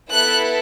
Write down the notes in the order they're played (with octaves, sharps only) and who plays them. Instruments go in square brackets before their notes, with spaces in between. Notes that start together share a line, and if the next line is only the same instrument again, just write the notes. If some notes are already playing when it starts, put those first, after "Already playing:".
[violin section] B3 E4 A4 F#6